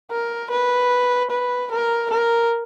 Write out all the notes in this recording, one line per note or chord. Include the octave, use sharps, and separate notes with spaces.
A#4
B4
B4
A#4
A#4